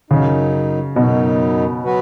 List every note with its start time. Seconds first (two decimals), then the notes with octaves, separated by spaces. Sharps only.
0.11 F#2 C#3 F#3 D#4
0.96 F#2 B2 F#3 D#4
1.84 F#3 B3 F#4 B4